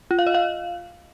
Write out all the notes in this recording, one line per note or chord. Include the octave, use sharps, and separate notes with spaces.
F4
F5
D#5
F5